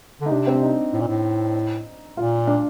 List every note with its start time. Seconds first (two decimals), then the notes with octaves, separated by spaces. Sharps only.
0.21 D3
0.26 D#4
0.31 C3 D4
0.47 C4
0.55 D4
0.62 D#4
0.93 A2
1.01 A#2
1.07 A2
2.16 A#2 F4
2.47 D4